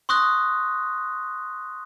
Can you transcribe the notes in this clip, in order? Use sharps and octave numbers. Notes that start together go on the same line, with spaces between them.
C6 C#6 D#6 F#6 A#6